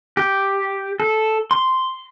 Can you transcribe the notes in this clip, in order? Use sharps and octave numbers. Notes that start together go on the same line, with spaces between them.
G4
A4
C6